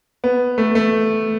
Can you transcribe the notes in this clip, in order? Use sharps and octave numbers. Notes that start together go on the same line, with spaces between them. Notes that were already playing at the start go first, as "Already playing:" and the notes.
B3
A3
A3